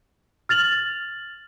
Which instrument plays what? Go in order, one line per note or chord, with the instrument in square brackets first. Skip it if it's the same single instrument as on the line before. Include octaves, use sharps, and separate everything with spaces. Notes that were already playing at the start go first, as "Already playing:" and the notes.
[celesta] F6 A6 F7 F#7